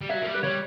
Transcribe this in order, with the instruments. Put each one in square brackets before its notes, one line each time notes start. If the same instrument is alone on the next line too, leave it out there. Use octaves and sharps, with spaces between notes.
[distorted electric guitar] G3
[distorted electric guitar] F#3 [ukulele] E5
[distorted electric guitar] A#3
G3
[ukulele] B4
[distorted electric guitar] G3 [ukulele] C#5